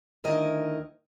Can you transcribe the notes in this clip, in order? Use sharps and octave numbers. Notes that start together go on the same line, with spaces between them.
D2 D#3 E4 A#4 D#5